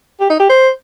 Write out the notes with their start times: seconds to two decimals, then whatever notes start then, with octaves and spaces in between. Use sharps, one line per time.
0.20 G4
0.30 D#4
0.40 G4
0.49 C5